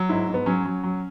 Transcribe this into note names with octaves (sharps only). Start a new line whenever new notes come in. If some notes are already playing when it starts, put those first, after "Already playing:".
Already playing: F#3
G#2 E4
G#2
B3
F#3 C#4
F#3
F#3